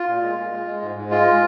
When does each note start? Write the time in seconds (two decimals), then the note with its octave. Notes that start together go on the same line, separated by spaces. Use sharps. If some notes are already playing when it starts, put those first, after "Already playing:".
Already playing: F4
0.08 A#2
0.23 G#3
0.38 G#3
0.52 G#3
0.67 G#3
0.82 G#2
0.96 G#2
1.11 G#3 F4